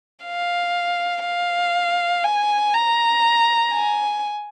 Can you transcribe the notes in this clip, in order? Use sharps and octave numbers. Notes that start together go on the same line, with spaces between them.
F5
F5
G#5
A#5
G#5